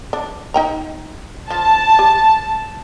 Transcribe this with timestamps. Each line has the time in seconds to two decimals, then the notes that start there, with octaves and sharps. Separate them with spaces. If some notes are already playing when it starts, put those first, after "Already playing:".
0.13 D4
0.54 D#4 G5 A#5
1.50 F3 A5
1.99 G4